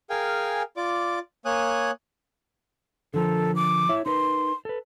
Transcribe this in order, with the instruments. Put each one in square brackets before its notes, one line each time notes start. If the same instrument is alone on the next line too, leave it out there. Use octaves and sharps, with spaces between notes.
[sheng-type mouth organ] G#4 A#4 F5 G5 G#5
F4 D5 D6
A#3 C#5 G#5 D#6 F#6
[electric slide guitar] D3 F3 A#4 [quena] A4
[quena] D6
[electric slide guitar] E4 C#5 E5
[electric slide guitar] D#4 A#4 B4 [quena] C6
[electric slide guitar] A4 B4